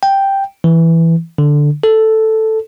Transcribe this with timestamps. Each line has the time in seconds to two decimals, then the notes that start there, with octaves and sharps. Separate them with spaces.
0.03 G5
0.64 E3
1.38 D3
1.83 A4